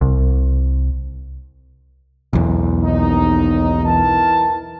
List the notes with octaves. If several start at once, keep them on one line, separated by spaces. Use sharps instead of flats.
C2
B1 E2
D#2 D#4
E3 A#4 A5